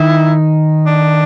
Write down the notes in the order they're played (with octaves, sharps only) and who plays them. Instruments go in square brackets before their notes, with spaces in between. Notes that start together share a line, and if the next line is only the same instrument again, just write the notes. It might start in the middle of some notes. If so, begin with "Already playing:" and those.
Already playing: [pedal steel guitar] D#3 D#4 [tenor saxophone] E4
[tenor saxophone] D4